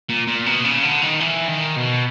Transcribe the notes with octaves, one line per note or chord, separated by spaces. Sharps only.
A#2
A#2
B2
C#3
D3
D#3
E3
D#3
B2